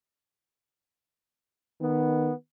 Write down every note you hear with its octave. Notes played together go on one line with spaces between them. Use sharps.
D#3 B3